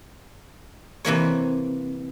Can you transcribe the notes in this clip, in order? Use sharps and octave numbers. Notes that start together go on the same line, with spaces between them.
C3 E3 A#3 C#5